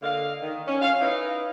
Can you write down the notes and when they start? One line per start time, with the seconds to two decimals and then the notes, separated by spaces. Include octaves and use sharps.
0.03 D3 A#3 D#5 F5
0.41 D#3
0.67 C#4
0.81 F5
1.01 D#4 E4 B4 C#5 D#5 F5